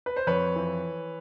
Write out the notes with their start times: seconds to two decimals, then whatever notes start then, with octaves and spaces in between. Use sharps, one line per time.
0.06 B4
0.16 C5
0.27 F2 B4 C#5
0.56 E3